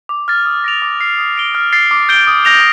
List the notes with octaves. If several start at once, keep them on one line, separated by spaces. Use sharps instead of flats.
D6
F6 A6
D#6
A#6 D7 F7
D6
F6 C7
D#6
A#6 D7 G7
F6
A6 C7
D6
G6 D7 G7
D#6
G6 A#6 F7